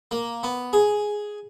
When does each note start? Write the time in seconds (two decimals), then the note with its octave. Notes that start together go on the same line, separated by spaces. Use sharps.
0.11 A#3
0.43 B3
0.73 G#4